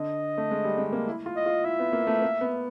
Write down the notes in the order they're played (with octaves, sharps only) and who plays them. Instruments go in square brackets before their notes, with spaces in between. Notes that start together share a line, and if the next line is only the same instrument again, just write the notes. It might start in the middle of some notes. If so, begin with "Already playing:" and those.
Already playing: [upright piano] D3 [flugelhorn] D#5
[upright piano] A3
G#3
G3
G#3
A#3
E4
F4
[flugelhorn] D#5
[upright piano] F4
[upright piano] E4 [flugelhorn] E5
[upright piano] B3
A#3
A3
A#3
B3